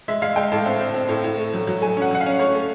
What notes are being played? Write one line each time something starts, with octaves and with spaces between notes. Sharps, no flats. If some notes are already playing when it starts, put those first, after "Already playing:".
G#3 E5
G#3 F5
G#3 G5
A2 A5
C4
C4
C4
A2
A2
A3
F#3
F#3
A3 G#5
C#4 F#5
F#3 F#5
F5
C#4
A3 C#5
A3